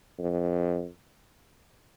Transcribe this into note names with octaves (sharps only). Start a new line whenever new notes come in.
F2